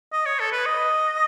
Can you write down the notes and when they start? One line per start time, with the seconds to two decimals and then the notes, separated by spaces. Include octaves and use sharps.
0.13 D#5
0.25 C#5
0.40 A4
0.52 B4
0.66 D#5